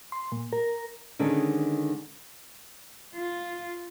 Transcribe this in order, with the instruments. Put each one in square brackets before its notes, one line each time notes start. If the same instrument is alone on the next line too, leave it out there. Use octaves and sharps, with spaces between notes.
[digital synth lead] C6
A#2
A#4
[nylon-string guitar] D3 D#3 G#3 C#4
[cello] F4